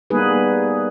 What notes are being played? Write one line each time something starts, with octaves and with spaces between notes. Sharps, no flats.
G3 A#3 B3 D#4 G#4 B4